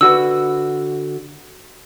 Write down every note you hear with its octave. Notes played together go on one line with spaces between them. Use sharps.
D3 F#4 B4 E6